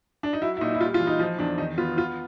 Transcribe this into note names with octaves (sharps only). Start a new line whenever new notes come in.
D4
D#4
F#3 E4
E4
A#2 D#4
E4
G3 F4
F4
E3
D#4
F3 D#4
E2 D4
D#3 D#4
B3 F4
B3 F4